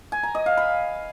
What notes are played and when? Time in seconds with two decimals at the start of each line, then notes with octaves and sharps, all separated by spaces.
0.12 G#5
0.23 A#5
0.35 D#5
0.46 F5
0.57 B5